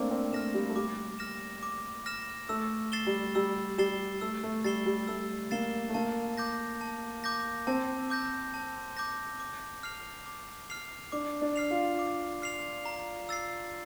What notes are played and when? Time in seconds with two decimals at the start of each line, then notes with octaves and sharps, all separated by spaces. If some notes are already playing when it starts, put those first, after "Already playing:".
Already playing: A3 A#3 C4 D4 D6
0.11 C4
0.33 A3 F6 A#6 E7
0.54 G3
0.70 A3
0.76 G3 D6
1.19 F6 A#6 E7
1.63 D6
2.06 F6 A#6 E7
2.49 A3 E6
2.92 A6 C7 E7 G7
3.07 G3
3.35 G3 E6
3.78 G3 A6 C7 E7 G7
4.21 A3 E6
4.43 A3
4.64 G3 A6 C7 E7 G7
4.86 G3
5.08 A3 E6
5.51 A#3 A6 C7 E7 G7
5.89 A3
5.94 A#3 A5
6.37 D6 G6 A#6
6.81 A5
7.24 D6 G6 A#6
7.67 C4 A5
8.10 D6 G6 A#6
8.54 A5
8.97 D6 G6 A#6
9.40 D6
9.83 F6 C7 F7
10.26 D6
10.70 F6 C7 F7
11.12 D4 D6
11.42 D4
11.56 F6 C7 F7
11.70 F4
11.99 D6
12.42 F6 C7 F7
12.85 A#5
13.29 E6 A6 C7